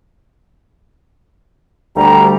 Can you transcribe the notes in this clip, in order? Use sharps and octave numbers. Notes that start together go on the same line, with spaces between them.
D2 G3 A#5